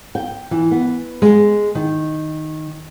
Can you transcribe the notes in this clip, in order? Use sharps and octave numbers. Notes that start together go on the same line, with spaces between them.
G5
E3
B3
G#3
D#3